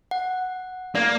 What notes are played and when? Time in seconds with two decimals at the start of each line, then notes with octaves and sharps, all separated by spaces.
0.11 F#5
0.95 A#3 D5